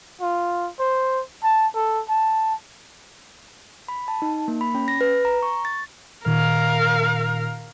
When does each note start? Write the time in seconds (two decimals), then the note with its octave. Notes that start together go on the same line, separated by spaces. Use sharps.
0.21 F4
0.79 C5
1.44 A5
1.75 A4
2.09 A5
3.88 B5
4.08 A5
4.22 D#4
4.48 A#3
4.61 B5
4.75 C#4
4.88 A#6
5.01 B4
5.25 A#5
5.43 C#6
5.65 A6
6.26 A#2 D#3 A#4 F5